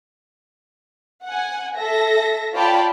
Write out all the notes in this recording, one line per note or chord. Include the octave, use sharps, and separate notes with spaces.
F#5 G#5
A4 E5 A#6
F4 C#5 D5 G5 A5 B5